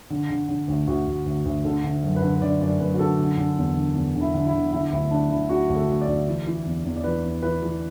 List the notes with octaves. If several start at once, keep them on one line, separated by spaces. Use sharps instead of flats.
D3
D3
D3
D2
D2 F#4
D2
D2
D2
D3 A4
D3
F#2
B4
D3
B4
D3 D5
F#2 D5
F#2 B4
F#4
D3 A4
D3
D3
E2
D3
E2
D3
E4
D3
E4
D3
D3 E4
D2 E4
D2 D4
D3 E4
D2 F#4
D2
A4
D2
D5
D2
E3
E3
E2
E2
D5
E3 B4
E2
E3 B4
E3